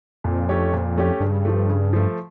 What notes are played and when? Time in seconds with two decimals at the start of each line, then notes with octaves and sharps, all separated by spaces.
0.24 F2 A#2
0.49 A3 C#4 G4 C#5
0.73 A#2
0.97 A3 C#4 G4 C#5
1.20 G2 C#3
1.45 F3 A3
1.69 C#3
1.93 F3 A3